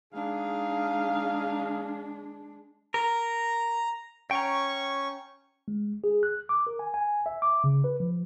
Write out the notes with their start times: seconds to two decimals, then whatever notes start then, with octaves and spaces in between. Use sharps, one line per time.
0.13 G#3 D4 D#4 G#4 F5
2.94 A#4 A#5
4.31 C#4 G5 A#5 C#6
5.68 G#3
6.04 G#4
6.23 F#6
6.49 D6
6.67 A#4
6.79 G#5
6.94 G#5
7.26 E5
7.42 D6
7.64 C#3
7.84 B4
8.00 F3